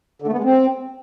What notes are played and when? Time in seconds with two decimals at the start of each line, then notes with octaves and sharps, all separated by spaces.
0.22 D3
0.27 A3
0.33 B3
0.38 G#3
0.44 C4